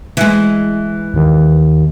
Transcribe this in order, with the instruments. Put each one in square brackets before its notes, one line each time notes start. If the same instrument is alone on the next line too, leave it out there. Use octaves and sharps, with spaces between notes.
[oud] E3 G#3
[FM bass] D#2